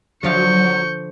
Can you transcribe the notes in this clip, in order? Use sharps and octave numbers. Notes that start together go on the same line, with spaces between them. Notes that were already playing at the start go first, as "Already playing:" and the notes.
D3 F3 F#3 F5 C#6 G6